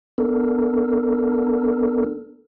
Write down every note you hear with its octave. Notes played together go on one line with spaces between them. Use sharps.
B3 D4 A4 A#4